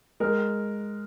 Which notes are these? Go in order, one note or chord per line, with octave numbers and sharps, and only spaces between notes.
G#3 A#4